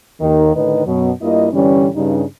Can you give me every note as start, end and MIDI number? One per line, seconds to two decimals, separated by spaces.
0.21 0.54 39
0.21 0.54 51
0.55 0.85 45
0.55 0.85 50
0.55 0.85 51
0.55 0.85 63
0.55 0.85 71
0.55 0.85 75
0.86 1.10 42
0.86 1.10 47
0.86 1.10 54
1.21 1.48 43
1.21 1.48 58
1.21 1.48 64
1.21 1.48 65
1.21 1.48 75
1.53 1.88 43
1.53 1.88 50
1.53 1.88 52
1.53 1.88 55
1.53 1.88 61
1.95 2.22 43
1.95 2.22 49
1.95 2.22 63